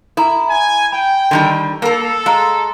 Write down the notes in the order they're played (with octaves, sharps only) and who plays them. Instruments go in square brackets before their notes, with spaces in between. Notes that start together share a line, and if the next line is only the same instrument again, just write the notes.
[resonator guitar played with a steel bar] E4 [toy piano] A4 A#5
[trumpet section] G#5
[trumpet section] G5 [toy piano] B5
[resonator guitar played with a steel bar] D3 D#3 G3
[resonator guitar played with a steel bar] A#3 A#4 [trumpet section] A4
[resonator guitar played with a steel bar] G#3 [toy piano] F5 A#5